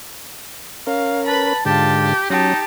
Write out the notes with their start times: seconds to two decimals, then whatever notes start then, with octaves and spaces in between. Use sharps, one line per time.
0.87 C#4 A#4 F5
1.27 B4 A5 B5
1.65 G#2 D3 F4 G4 A5
2.30 F#3 C#4 D#4 G4 A5